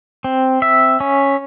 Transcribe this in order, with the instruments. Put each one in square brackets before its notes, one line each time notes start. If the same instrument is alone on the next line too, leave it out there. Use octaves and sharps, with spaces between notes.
[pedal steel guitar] C4
E5
C#4